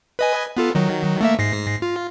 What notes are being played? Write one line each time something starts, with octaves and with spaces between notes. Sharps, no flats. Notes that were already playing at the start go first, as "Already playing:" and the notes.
B4 D#5 G#5
B3 F4 A4
D#3 F#3
A3 A#3 E5
G#2 A#6 C7
F4